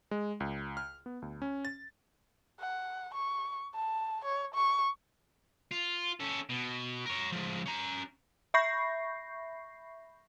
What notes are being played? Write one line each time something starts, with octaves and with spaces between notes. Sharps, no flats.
G#3
C#2
F6
B3
D2
C#4
A6
F#5
C#6
A5
C#5
C#6
F4
C#4 A4
B2
A#4 C#5
F3 G#3
C#4 A#5
E5 B5 C#6 G6 A#6 C7